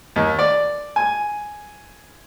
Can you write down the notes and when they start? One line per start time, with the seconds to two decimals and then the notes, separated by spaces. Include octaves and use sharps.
0.16 D#2
0.39 D5
0.96 G#5